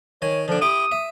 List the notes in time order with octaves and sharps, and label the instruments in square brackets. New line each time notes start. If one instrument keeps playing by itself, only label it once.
[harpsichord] D#3 G#5 [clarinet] C#5
[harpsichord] D3 D4 [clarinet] F3
[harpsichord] E4 G4 D6 [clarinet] D#6
[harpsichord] E5